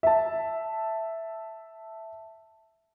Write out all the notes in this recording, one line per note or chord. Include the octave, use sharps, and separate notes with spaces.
E5 A5